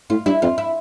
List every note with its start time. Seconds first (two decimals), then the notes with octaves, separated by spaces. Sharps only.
0.10 A2 F4
0.25 G2 E4
0.42 F2 F4
0.58 E4